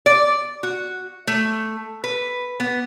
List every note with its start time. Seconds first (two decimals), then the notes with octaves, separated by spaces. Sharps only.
0.06 D5
0.63 F#4
1.27 A3
2.04 B4
2.60 B3